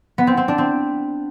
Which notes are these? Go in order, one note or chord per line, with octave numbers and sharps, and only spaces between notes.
B3
C4
C4
D4
C4